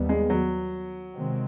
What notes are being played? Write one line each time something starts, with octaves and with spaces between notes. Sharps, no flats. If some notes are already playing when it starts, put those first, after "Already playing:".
Already playing: D#2 D#3 G3 B3
G#3
F#3
C3 D#3 G#3 C4